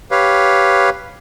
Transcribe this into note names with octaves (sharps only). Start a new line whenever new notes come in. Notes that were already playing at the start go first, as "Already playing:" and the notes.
G4 B4 C#5 F5